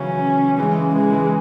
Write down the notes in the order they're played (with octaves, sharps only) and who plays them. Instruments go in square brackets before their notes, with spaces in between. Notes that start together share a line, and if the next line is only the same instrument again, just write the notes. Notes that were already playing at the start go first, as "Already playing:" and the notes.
Already playing: [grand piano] C#3 E3 F#3 [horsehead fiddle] C#4
[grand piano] E3 [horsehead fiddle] G#3
[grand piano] C#3
[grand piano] E3 [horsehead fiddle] G#3
[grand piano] E3